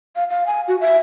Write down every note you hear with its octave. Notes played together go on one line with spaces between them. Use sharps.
F5
F5
G#5
F#4
E5